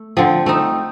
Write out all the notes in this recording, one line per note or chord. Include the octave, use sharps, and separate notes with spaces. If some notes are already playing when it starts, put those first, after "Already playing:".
Already playing: A3
D3 F3 C4
A3 C4 D#4